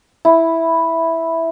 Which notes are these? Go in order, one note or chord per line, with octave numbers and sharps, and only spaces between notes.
E4